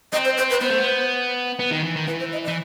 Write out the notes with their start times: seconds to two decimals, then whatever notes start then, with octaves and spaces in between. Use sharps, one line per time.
0.12 C4 D#5
0.25 C5
0.38 C5
0.50 B4
0.62 B3 C5
0.70 A3
0.78 B3
1.59 B3
1.71 D#3
1.84 E3
1.96 D#3
2.07 E3 B4
2.19 C5
2.33 D#5
2.44 D#5
2.48 E3